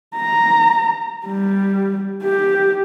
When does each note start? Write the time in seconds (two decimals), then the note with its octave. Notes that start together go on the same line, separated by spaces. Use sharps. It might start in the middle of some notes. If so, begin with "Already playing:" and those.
0.16 A#5
1.26 G3
2.24 G4